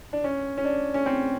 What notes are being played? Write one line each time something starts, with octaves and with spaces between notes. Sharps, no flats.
D4
C#4
C#4
D4
C#4
C4